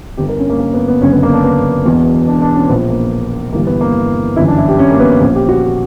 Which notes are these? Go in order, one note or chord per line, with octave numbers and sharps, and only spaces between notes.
G1 G2 D3 G4
A#4
C#4
A#3
A#3
B3
B3
F#1 F#2 D3 C#4
B3
A#3
D4
B3
E1 E2 B2
D4
D4
C#4
A#1 A#2 B3
A#3
G1 G2 E3 A#3
B3
A#3
G1 F#2 E3 E4
D4
E4
G4
C#4
A#3
B3
A#1 A#2 C#4
G4
F#4
G4